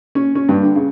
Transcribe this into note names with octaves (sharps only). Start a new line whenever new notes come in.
C#4
C#4
G2
D3
C#3